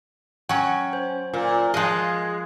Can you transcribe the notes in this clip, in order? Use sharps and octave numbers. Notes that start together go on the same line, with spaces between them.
F#3 C#4 G5 C#6
C5
A#2
F3 G#3 D#5 F5 F#6